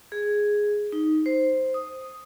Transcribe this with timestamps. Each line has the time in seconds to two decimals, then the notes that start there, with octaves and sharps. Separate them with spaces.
0.12 G#4
0.92 D#4
1.26 C5
1.74 D#6